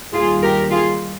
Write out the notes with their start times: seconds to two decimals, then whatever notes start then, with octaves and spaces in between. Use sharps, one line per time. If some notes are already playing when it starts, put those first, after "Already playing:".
0.14 D#2 D#3 G3 F4 G#4
0.42 G4 A#4
0.71 F4 G#4